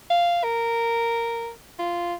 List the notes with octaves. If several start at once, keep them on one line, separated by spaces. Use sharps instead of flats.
F5
A#4
F4